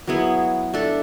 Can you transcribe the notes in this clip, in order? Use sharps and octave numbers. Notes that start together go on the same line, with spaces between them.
F#3 B3 E4 G#4
A3 D4 A4